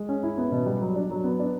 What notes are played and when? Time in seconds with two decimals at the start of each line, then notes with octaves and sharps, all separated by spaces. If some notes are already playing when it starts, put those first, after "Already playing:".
Already playing: G#3
0.09 C#4
0.23 E4
0.38 B3
0.52 B2
0.66 G3
0.81 F#3
0.96 D4
1.10 F#3
1.24 B3
1.39 D4